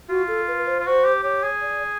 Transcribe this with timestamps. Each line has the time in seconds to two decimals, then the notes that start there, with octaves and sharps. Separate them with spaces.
0.09 F4 F#4
0.28 A4
0.48 B4
0.58 B4
0.67 C5
0.79 F4
0.86 F#4 C5
1.04 G4
1.23 G4 C#5
1.43 G#4
1.62 D5